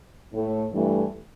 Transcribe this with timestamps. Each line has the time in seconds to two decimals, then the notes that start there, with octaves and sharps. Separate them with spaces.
0.32 A2 A3
0.72 G2 E3 A3